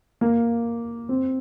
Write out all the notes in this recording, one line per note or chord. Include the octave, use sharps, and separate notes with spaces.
A#3
C4